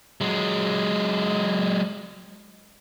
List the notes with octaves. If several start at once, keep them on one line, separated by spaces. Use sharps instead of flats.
F#3 G#3